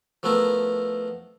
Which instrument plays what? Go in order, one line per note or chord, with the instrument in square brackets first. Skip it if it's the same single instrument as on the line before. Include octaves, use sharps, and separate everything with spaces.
[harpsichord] F3 A3 B3 E4 A#4